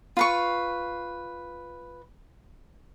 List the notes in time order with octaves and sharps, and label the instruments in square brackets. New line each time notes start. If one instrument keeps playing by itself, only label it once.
[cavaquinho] F4 B4 C#6